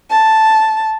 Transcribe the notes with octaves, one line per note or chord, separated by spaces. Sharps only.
A5